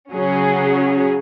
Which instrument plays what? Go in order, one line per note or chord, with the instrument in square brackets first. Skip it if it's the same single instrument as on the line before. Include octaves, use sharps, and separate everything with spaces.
[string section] C#3 F#3 C#4 G#4